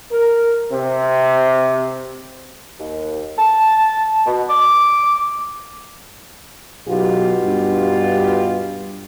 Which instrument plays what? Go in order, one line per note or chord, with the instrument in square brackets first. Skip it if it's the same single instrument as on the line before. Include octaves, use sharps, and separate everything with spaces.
[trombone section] A#4
C3
[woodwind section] D#2
A5
B2
D6
[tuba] B1 [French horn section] B2 F4 G4
[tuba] G2